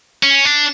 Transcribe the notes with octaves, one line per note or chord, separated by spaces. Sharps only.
C#4
D4